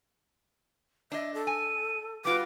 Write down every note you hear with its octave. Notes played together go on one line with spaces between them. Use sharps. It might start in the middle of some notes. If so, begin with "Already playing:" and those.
D4 D#5 E5
A4
G#5 D#7
G3 F4 F#4 B4 D6